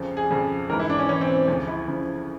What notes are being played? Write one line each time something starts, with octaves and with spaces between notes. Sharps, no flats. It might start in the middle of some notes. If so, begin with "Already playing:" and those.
Already playing: F2 C#3 F3
G#4
F2 C#3 F3 G#4
G#2 E3 A#4
E4
D4
C#4
G#2 E3 C#4
C4
D4
D2 C#3 F3
E4
D2 C#3 F3